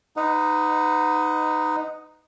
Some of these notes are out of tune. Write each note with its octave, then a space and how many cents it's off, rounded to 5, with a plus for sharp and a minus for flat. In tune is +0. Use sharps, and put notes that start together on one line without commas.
D#4 +0 B4 +30 F#5 -10